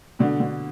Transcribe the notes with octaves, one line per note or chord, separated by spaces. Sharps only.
B2 D3
B2 D3